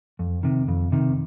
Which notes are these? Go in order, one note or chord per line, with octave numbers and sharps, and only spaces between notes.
F2
C3 D#3
F2
C3 D#3